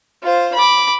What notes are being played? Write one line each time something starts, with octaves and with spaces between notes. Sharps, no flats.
F4 C5
B5 D6